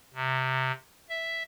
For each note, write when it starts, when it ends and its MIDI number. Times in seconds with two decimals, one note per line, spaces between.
0.14 0.72 48
1.09 1.43 76